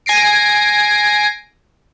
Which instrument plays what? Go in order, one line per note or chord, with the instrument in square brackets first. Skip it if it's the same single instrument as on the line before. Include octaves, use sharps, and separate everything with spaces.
[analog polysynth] G#5 A#6 C7 D7